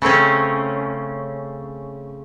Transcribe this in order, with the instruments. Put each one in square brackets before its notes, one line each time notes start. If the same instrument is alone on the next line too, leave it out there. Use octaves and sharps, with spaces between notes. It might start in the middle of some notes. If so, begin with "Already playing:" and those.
[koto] C#3 A3 C4 C#4